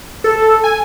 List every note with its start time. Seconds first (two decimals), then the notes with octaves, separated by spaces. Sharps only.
0.24 A4
0.64 G#5